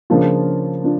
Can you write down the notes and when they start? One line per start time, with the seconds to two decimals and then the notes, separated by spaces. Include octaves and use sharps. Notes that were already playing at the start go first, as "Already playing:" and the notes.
0.10 C#3 F3 A#3 D4 F4
0.84 D4 F4